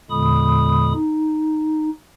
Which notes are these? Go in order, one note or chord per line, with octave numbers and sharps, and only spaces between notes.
E2 A#2 D3 G#3 B5 D#6
D#4